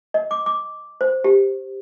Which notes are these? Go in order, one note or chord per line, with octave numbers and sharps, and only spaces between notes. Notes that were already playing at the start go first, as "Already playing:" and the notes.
D#5
D6
D6
C5
G4